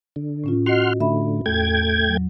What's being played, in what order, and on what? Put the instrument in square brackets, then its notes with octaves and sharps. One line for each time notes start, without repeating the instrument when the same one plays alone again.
[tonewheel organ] D3
[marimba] A2 C#4 F4
[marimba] F#4 D#5 [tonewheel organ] F#5 C6 F6
[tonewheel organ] A2 D3 [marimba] E5 B5
[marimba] E2 [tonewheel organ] A3 G5 G#6
[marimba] F#3